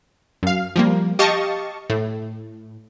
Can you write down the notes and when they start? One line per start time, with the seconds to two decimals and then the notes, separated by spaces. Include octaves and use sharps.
0.43 F#2 F5
0.76 F3 G3 A#3
1.19 G4 D#5 F5 A5 C#6
1.90 A2